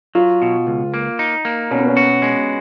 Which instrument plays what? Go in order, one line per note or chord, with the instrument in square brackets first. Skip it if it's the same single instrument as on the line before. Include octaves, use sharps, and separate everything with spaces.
[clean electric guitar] F#3 [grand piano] F4
[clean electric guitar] B2
C#2
A#3
D#4
A#3
[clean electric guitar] B2 [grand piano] C#4
[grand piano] B3
C#4
[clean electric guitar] F#4
G#3